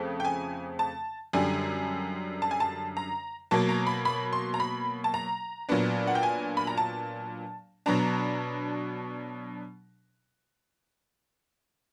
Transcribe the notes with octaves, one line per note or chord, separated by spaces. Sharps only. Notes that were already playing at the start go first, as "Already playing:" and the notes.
Already playing: F2 C#3 A3 C4
G5
G#5
A5
F#2 D3 G3 G#5
A5
G#5
A5
A#5
B2 F#3 A#3 A5
A#5
B5
B5
C6
A#5
B5
A5
A#5
A#2 F#3 B3 D4
F#5
G5
G#5
B5
A#5
A5
B2 F#3 B3 D4 A#5